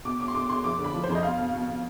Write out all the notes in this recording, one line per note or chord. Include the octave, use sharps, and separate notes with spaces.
B2 D6
B2 D6
C6
B2 D6
B2 C6
F2 D6
D3
B5
F3
C5
F2
D#5
B2 F5
B2
B2
B2